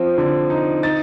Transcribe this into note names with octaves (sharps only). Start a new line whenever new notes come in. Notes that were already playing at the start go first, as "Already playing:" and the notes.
Already playing: F3 C4
D3
D#4
D#4 A6